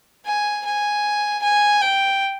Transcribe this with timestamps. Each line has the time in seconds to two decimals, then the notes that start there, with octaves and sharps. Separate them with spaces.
0.25 G#5
0.65 G#5
1.43 G#5
1.82 G5